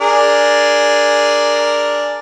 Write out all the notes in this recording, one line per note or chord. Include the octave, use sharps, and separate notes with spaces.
D4 G#4 A#4